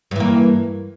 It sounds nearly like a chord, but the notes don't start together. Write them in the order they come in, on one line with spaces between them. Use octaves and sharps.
G2 E3 A#3